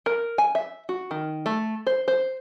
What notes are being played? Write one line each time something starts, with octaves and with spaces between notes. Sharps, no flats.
A#4
G#5
E5
F#4
D#3
A3
C5
C5